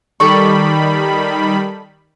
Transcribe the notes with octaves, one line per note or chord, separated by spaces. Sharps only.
D#3 G3 A4 D5 B5 C#6